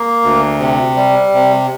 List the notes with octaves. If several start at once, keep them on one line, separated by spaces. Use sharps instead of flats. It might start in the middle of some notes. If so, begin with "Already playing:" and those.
Already playing: A#3
D2
C3
G3
C3